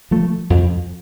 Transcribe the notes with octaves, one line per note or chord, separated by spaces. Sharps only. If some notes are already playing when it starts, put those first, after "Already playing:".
F3 A3
F2